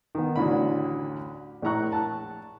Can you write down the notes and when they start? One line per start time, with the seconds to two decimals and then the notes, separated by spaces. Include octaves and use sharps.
0.15 D#3 B3
0.36 A1 D2 A2 D3 E4 B5
1.62 A#1 A2 E4 A#5 C#6 F#6
1.92 A5 F#6